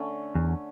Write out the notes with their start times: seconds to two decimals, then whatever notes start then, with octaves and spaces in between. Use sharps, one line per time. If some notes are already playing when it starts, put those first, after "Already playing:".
Already playing: D3 A3 C#4
0.35 E2